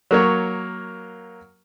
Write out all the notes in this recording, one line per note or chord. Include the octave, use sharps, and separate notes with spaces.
F#3 A#3 C#5